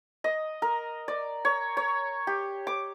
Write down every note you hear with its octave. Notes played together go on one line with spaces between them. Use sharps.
D#5
A#4
D5
C#5
C#5
G4
D6